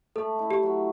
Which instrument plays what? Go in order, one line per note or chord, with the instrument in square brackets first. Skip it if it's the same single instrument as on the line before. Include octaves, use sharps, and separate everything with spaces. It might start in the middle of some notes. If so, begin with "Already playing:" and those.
[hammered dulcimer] A3 [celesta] A4
[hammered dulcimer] E4
[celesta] G4
[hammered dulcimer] F#3